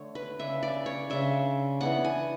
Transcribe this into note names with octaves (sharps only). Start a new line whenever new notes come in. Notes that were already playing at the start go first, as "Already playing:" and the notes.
Already playing: D3 A3 D4 C#5
B4
C#3 G#3 D4 E5
D5
C#5
C#3 G#3 D4 E5
E3 B3 D4 F#5
G#5